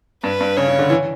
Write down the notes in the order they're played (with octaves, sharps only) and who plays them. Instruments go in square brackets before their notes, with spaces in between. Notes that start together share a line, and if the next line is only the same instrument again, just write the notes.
[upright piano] G2 [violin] B4
[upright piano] G2
[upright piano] C#3 [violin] C#5
[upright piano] C#3
D3
E3